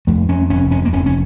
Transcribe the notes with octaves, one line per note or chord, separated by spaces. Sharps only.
F2 A3
F2 C#4
F1 C#4
F2 C#4
A#3
F1 C#4
C#4